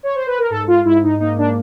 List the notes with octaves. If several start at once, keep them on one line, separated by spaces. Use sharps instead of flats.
C#5
C5
B4
A#4
G#2 A4
F4
G#2 E4
D#4
A#3 D#4
D4